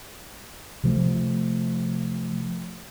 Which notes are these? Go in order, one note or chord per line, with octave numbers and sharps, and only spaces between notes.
C3 F3 A3